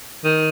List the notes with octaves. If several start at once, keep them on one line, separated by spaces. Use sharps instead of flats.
D#3